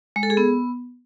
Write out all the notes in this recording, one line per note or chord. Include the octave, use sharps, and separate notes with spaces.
G#3
A4
G#4
B3